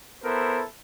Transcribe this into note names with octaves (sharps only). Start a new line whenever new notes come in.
B3 E4 A4 A#4 C5